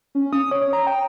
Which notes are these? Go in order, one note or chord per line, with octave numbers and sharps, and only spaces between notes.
C#4
D#6
C#5
A#5
G5